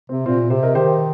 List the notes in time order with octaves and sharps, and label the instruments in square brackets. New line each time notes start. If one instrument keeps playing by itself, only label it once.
[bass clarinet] C3 [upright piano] C4
[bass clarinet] A#2 [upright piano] C4 F4
[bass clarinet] C3 [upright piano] G4 C5
[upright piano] A#4 D#5
[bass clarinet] D#3 [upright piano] G4 C5